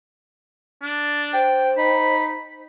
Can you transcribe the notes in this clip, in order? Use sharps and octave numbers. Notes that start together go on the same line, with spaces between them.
D4
C5 G5
D#4 B5